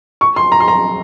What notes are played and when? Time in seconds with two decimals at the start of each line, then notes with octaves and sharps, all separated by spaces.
0.21 C#6
0.36 C6
0.52 A#5
0.60 C6
0.68 A#5